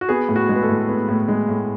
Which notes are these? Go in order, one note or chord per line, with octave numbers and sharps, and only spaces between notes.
F#4
B3 G#4
A2
F#4
G#3
B4
A4
A2
B3
A2
G#3
A2